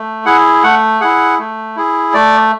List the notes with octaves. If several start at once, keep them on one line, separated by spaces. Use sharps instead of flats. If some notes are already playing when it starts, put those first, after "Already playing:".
Already playing: A3
E4 G#4 F#5
A3 F#5
E4 G#4 F#5
A3
E4 G#4
A3 D5